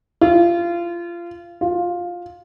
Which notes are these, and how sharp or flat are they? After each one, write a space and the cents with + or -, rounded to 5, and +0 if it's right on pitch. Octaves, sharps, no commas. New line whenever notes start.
F4 -25
F4 +10